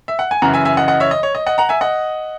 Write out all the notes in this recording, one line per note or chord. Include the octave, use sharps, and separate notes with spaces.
E5
F#5
G#5
F#2 C#3 E3 F#5 A#5
E5 G#5
E5 G#5
D#5 F#5
D#5 F#5
C#5 E5
D#5
C#5
D#5
D#5 F#5
F#5 A#5
E5 G#5
D#5 F#5